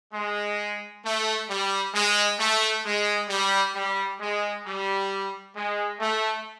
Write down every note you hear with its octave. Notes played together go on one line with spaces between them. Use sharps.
G#3
A3
G3
G#3
A3
G#3
G3
G3
G#3
G3
G#3
A3